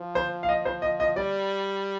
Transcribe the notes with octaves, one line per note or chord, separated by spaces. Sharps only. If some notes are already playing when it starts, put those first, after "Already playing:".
Already playing: F3
C5
F5
D#5
C5
D#5
D#5
G3 D5